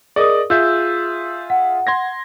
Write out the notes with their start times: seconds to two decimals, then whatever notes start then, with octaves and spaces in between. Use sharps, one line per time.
0.16 G#4 A#4 D5 D#5 D#6
0.50 F4 G#4 E5 E6 G6
1.50 F#5
1.87 C6 G#6 A#6